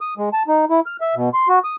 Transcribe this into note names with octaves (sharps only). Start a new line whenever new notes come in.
D#6
G#3
A5
D#4
E4
F6
E5
B2
C6
F#4
D#6